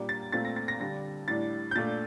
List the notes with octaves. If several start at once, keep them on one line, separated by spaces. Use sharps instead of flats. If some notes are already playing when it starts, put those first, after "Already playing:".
Already playing: A#2 G3 A#3 D4
A6
A#2 A3 C4 A6
A#6
A6
A#6
D3 G3 D4 A#6
A2 G3 D4 A6
G6
A#2 A3 D4 A6